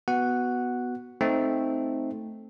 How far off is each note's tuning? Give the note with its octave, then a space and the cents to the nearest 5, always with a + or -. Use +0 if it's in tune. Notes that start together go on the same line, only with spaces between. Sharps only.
B3 +0 F#4 +0 F#5 +0
A3 +0 C4 +0 D#4 +5